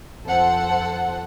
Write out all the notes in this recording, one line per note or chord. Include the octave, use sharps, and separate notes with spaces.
F2 A4 C5 F#5